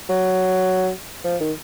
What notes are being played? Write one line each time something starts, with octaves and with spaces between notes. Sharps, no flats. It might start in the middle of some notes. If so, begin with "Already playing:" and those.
F#3
F3
D#3